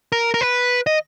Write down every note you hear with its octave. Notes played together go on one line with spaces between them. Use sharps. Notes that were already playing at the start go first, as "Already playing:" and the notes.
A#4
A#4
B4
D#5